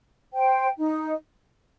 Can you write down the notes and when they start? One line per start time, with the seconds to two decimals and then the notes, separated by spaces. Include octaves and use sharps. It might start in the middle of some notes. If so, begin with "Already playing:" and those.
0.33 C5 G5
0.78 D#4